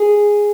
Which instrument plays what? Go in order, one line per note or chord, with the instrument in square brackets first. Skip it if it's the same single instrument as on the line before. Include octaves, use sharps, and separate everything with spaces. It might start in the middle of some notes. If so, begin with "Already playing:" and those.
Already playing: [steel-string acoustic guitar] G#4